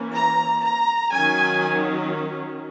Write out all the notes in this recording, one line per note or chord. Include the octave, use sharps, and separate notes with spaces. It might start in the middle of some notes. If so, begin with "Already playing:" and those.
Already playing: E3 A#3 C#4
A#5
A#5
D#3 F#3 C#4 G#5